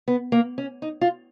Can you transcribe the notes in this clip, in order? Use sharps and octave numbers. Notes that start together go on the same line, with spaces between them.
B3
A#3
C#4
D#4
F4